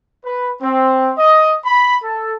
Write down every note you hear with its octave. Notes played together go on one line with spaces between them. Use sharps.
B4
C4
D#5
B5
A4